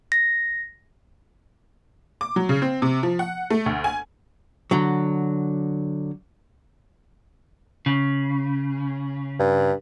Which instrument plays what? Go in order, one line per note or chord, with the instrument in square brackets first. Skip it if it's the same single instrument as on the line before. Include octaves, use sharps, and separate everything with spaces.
[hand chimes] A#6
[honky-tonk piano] D6
F#3
C#3
C4
C3
F3
F#5
A3
D2
G#5
[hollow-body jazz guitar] D3 F#3
[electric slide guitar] C#3
[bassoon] G2